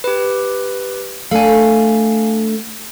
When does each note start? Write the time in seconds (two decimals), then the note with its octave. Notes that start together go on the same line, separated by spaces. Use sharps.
0.04 G4 B4
1.31 A3 D4 F5 G#5